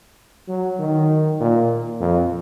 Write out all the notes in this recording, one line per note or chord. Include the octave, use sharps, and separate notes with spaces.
F#3
D#3
A#2
F2